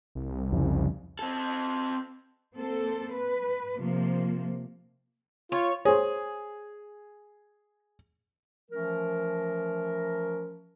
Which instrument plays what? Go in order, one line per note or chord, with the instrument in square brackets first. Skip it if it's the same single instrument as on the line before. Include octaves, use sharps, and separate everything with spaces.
[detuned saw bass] C2
[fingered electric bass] F2 C#3
[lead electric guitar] C4 A4
[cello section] A#3 C4 A4
B4
C3 F3 A#3
[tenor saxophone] F4 [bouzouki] C#5
[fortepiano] G#4 [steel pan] C5 C#5
[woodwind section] E3 F3 A3 C#4 A#4